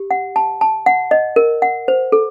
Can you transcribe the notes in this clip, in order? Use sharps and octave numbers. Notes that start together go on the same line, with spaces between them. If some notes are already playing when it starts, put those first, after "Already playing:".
Already playing: G4
F#5
A5
A5
F#5
D#5
A#4
F#5
C5
A4